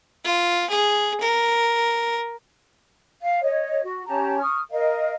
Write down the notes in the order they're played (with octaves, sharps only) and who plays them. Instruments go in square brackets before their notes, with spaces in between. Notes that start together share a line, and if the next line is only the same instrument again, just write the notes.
[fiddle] F4
G#4
A#4
[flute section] F5
C#5 D#5
F#4
C#4 G4 A5 A#5
C#6 D#6 F6
A#4 D#5 F5